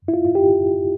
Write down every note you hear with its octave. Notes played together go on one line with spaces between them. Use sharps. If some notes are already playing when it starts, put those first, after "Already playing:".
E4
F4
F4
G4